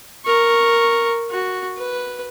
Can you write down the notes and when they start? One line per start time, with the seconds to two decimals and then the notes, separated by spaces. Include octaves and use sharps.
0.25 A#4 C#6
1.31 F#4
1.77 B4